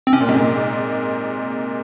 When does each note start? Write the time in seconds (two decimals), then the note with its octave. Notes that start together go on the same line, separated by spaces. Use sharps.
0.07 C4
0.13 C3 C#4
0.21 A#2
0.29 G#2
0.37 A#2